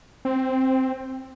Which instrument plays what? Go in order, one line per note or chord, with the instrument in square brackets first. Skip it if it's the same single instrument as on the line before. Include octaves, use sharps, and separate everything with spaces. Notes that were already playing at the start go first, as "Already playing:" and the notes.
[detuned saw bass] C4